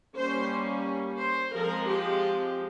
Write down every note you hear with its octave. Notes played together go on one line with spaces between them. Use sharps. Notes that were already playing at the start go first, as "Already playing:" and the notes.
G3 A#3 C#4 C5
C5
F3 G#3 C4 A#4
G4